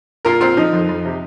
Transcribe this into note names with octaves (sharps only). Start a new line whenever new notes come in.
A#2 F4 A#4
A#2 C4 F4
F3 D#4
F2
F2
C3